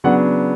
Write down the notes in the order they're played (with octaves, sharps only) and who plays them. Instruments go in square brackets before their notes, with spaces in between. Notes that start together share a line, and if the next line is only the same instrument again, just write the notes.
[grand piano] C#3 F#3 B3 D4 F#5